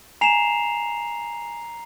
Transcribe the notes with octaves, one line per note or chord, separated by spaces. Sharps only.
G#5 A#5 C7 E7 F7